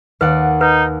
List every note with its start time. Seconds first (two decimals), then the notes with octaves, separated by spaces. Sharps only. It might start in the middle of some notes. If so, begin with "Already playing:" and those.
0.21 D#2 B4 D5 F#5
0.61 D#4 B4